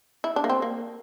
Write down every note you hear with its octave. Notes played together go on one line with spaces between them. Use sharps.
E4
D4
A#3
C4
A#3